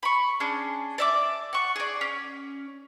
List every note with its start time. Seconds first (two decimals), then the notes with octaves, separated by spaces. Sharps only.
0.03 B5 C#6
0.40 C#4 D4 G#4
0.98 D5 E5 D6
1.53 F#5 C#6
1.76 G#4 D5
2.01 C#4